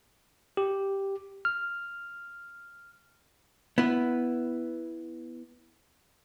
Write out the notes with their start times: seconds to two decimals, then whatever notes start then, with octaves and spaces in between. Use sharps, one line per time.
0.57 G4
1.45 F6
3.78 B3 E4 B4